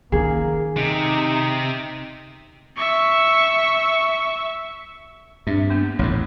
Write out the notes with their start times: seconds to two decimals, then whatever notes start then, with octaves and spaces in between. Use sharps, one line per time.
0.12 D#3 A#3 C#4 G#4
0.77 C3 D#4
2.77 E5 C#6
5.47 G2 C4 D4 E5
5.70 A#3 B3 D4
5.99 A1 F2 G#2 C#5